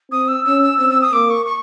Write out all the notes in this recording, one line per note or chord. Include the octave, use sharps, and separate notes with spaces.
C4 D#6
E6
C#4 E6
E6
C4 E6
E6
D#6
A#3 D6
C#6
C#6